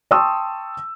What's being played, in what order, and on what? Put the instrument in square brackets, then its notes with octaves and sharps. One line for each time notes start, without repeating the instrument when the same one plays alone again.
[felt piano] G5 A5 C6 C#6 D#6 E6